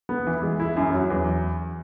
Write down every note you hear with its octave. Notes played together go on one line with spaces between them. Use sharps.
B3
E3
G#3
E4
F#2
F#3
E2